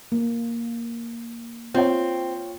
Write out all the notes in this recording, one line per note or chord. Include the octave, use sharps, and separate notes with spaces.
A#3
C4 F4 C#5 G5